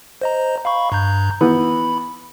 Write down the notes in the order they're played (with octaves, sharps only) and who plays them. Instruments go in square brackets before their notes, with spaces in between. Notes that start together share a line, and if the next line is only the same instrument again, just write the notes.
[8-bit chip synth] C5 D#5 A#5
F5 B5 C#6
G2 A#5 G6
[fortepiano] E3 B3 [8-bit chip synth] B5